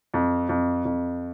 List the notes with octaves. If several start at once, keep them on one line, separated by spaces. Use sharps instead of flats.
F2
F2
F2